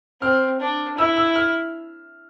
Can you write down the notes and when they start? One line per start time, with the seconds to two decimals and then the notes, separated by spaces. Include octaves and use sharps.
0.21 C4 F6
0.60 D4
0.98 E4 E6
1.16 E6
1.36 F6